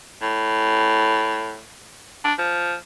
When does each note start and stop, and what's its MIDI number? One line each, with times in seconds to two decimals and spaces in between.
0.22 1.60 45
2.25 2.33 62
2.39 2.75 53